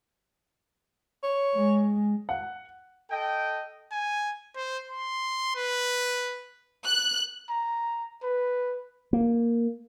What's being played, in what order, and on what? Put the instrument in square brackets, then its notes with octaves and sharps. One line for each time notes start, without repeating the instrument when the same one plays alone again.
[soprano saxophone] C#5
[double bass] G#3
[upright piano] F#5
[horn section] A4 D#5 G5
[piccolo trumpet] G#5
C5
C6
B4
[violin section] F#6
[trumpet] A#5
B4
[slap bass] A#3